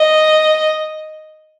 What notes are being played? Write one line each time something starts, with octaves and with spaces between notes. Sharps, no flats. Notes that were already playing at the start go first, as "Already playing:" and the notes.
Already playing: D#5